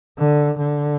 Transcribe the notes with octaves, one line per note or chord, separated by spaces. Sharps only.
D3
D3